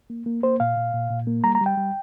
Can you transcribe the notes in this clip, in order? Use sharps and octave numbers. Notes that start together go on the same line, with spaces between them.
A#3
A#3
A#3 C5
A#2 F5
A#2
A#2
A#2
A#3
G3 A#5
A#5
G3
G5
G3